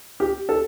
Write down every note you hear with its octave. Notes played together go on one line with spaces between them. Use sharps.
G4
A4